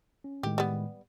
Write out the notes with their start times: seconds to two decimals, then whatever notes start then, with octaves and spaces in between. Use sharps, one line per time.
0.24 C#4
0.43 A2 D#3 G#3 G4
0.58 G3 B3